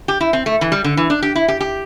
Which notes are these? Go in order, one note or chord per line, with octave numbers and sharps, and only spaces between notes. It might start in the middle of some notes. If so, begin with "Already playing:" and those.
G4
E4
C4
A3
E3
G3
D3
E3
D4
G4
E4
G4
G4